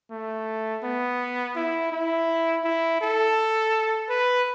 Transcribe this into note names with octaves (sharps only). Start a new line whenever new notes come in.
A3
B3
E4
E4
E4
A4
B4